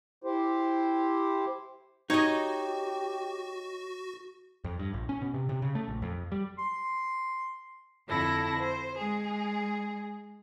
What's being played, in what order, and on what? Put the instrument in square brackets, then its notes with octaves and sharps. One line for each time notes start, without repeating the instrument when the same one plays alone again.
[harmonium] E4 G4 C5
[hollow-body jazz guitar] D#4 [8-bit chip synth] F#4 [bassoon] G4 [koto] C#5 D#5
[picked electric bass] F2
G2
A#1
C#4
B2
C3
C3
C#3
A3
A#1
F2
G3
[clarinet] C6
[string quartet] F2 D3 E4 A4 A#6
C5
G#3 G#4